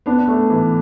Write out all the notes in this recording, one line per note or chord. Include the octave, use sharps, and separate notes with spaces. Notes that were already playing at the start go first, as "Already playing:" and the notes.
B3 D4
A3
E3